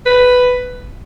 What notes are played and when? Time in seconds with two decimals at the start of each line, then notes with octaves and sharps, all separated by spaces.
0.06 B4